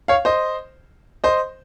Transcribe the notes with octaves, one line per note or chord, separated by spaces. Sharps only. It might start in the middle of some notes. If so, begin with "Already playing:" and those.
C#5 F5
C5 D#5
C5 D#5